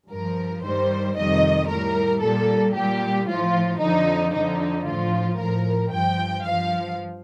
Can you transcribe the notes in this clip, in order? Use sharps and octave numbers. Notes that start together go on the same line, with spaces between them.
G2 F3 A#4
G2 D#3 G3 C5
F2 C3 D#3 G3 D#5
A2 G3 A#4
A#2 G3 A4
A#2 G3 G4
A2 F3 F4
F2 D3 F3 D#4
F2 D3 F3 D#4
A2 F3 F4
A2 F3 A#4
G2 F3 G5
G2 F3 F5